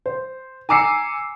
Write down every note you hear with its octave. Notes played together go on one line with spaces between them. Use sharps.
C5
G#5 A#5 D6 E6 C7 C#7